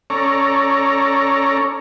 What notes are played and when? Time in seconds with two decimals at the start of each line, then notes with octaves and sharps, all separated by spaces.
0.10 C#4 A4 C#5 D5 A#5